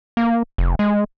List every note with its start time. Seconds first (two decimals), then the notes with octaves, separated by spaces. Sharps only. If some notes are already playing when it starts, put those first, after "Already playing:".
0.17 A#3
0.58 F1
0.79 G#3